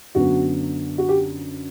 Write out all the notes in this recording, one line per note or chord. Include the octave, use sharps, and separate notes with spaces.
F#2 D3 F#3 B3 F#4
F#4
G4